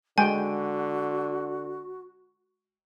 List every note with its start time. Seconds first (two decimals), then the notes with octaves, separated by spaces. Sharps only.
0.18 D3 G#3 F#4 G5 G#5